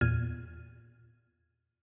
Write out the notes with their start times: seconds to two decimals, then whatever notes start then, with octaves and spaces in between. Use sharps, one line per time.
0.01 E2 A#2 F6 G#6 D#7